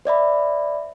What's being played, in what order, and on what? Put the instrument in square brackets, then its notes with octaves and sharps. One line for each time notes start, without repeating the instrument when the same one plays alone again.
[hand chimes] C5 D5 E5 B5